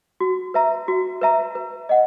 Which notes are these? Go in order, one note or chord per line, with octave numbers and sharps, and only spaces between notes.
F#4
B4 E5 A#5
F#4
B4 E5 A#5
B4
D#5 F#5